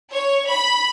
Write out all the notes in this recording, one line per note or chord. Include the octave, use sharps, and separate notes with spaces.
C#5
B5